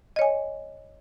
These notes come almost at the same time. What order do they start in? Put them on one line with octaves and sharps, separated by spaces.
D#5 C#5 G#5